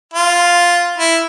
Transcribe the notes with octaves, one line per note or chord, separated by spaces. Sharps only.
F4
E4